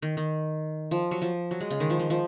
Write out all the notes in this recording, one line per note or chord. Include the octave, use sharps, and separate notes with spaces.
D#3
D#3
F3
F#3
F3
F#3
G#3
C#3
D#3
F3
D#3
F3